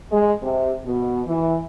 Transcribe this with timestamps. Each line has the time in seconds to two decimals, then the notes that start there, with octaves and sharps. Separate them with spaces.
0.12 G#3
0.42 C3
0.85 B2
1.26 E3